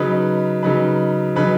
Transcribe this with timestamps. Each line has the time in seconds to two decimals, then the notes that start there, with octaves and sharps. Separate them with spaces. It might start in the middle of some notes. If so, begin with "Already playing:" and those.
Already playing: C#3 F#3 D#4 B4
0.63 C#3 F#3 D#4 B4
1.36 C#3 F#3 D#4 B4